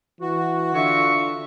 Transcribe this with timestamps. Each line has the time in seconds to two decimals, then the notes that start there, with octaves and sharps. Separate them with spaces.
0.21 E3 F#4
0.74 D3 F4 E5 C#6